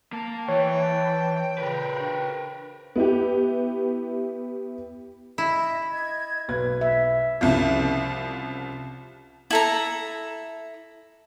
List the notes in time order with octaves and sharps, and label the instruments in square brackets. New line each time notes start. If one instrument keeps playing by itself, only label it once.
[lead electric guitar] A#3 [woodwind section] A5
[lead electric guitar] E3 [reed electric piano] C#5 [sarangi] G5
[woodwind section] A#2 C#3 [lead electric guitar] A#4 B4
[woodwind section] C#3 D4 F#4
[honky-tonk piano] B3 E4 G4
[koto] E4 [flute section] D#5 E5
[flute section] D#5 G#6
[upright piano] B1 B4 G#6
[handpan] E5
[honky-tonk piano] C2 C#3 F3
[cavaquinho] E4 A4 A#5